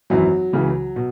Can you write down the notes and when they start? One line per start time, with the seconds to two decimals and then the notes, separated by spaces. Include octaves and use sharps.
0.10 G#1 F#2 E3 F#3
0.53 C#2 C#3 E3
0.96 B2